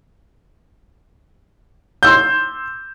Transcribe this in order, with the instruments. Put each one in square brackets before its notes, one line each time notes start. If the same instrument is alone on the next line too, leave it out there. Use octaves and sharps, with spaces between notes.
[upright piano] C6 E6 G6